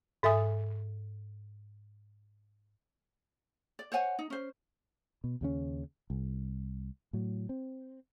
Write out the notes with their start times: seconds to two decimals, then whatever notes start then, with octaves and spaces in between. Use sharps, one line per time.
0.23 G#2 A4 E5 G#5 D#6
3.79 D5
3.92 C5 C#5 F#5 G#5
4.19 D#4
4.30 C#4 C5
5.24 B2
5.41 D#2 C#3 C#4
6.10 C2
7.13 A2 F#3
7.49 C4